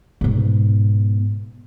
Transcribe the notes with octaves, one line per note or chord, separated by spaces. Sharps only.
G#2 B2